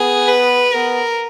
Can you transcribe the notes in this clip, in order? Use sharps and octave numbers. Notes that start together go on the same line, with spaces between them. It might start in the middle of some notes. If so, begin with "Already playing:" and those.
Already playing: B3 G#4
B4
B3 A#4